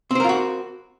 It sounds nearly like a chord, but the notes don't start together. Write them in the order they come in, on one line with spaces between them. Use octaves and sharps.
C4 C5 A#4 F4 F#4